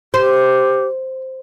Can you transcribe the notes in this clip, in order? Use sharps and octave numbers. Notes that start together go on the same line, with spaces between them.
G4 C5